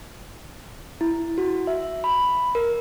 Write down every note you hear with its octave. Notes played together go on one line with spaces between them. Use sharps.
E4
F#4
E5
B5
A#4